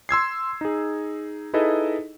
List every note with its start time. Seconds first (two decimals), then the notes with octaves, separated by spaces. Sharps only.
0.09 C6 E6 G#6 C7
0.61 D#4 G#4
1.53 D#4 E4 G#4 A4 B4 D#5